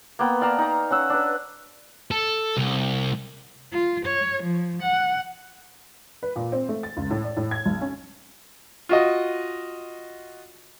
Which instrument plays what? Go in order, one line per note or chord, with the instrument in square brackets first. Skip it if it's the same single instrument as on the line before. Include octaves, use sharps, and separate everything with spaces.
[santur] A#3 B3 G5
D5 F5 A5 A#5
D#4 A#5
C#4 F#5 E6
D4 B4
[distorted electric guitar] A4
C2
[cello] F4
C#5
F3
F#5
[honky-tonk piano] B4
A#2
C4
A3
A6
C#2
A2
D5
A2
G#6
B1
C#4
[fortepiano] F4 F#4 D#5